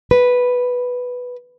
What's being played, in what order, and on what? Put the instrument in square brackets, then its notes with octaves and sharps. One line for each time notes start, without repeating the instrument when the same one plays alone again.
[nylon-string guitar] B4